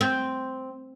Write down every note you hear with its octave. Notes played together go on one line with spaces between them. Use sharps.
C4